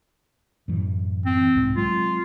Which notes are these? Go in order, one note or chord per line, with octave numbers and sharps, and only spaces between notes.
F#2 A2 E3
C4
C2 G#2
F#3 G#3 C4 F4